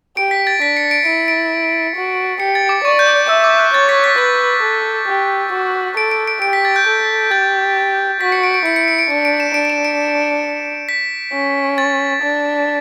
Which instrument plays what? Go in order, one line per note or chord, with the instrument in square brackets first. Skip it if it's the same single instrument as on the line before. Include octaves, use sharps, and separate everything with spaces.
[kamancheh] G4 [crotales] D7
[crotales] B6
A6
[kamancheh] D4 [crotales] B6
[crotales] C#7
D7
[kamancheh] E4 [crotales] D7
[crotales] D7
[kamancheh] F#4
[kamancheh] G4 [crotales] C#7
[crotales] A6
D6
[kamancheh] D5 [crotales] C#6
[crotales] G6
[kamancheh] E5 [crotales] E6
[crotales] D6
F#6
[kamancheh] C#5 [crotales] A6
[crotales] B6
B6
[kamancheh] B4 [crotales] A6
[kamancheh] A4
G4
F#4
[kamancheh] A4 [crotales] D7
[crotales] D7
D7
[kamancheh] G4 [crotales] D7
[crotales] B6
A6
G6
[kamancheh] A4
[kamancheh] G4 [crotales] A6
[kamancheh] F#4 [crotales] B6
[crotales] C#7
D7
D7
[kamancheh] E4 [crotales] C#7
[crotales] C#7
D7
D7
[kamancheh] D4 [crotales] C#7
[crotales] D7
E7
[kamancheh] D4 [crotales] D7
[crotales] D7
E7
D7
B6
[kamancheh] C#4
[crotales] A6
[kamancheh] D4